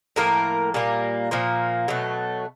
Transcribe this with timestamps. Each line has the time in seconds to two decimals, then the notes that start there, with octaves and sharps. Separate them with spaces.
0.16 A2 F3 A#3 A#4
0.74 A#2 G3 A#3
1.31 A#2 F3 A#3
1.88 B2 F#3 A3